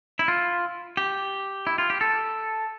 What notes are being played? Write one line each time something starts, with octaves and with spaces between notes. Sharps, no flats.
E4
F4
G4
E4
F4
G4
A4